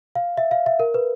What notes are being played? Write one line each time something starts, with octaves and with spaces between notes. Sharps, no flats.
F5
E5
F5
E5
A#4
B4